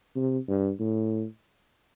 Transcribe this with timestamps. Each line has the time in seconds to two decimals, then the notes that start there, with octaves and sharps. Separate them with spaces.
0.16 C3
0.48 G2
0.80 A2